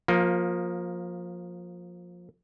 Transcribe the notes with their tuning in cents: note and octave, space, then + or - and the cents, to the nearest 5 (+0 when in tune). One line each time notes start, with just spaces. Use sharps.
F3 +20 A#3 +0